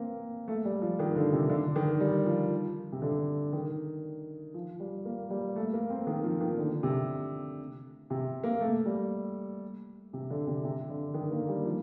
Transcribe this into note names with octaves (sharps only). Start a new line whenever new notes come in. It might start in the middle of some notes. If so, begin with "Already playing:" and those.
Already playing: A#3 C4
A3
G3
F3
D#3
D3
C3
D3
D#3
G3
F3
C3
D3
D#3
F3
G3
A#3
G3
A3
A#3
C4
D#3
F3
D#3
D3
C3
C3
A#3
A3
G3
C3
D3
C3
C3
D3
D#3
A#3
G3
F3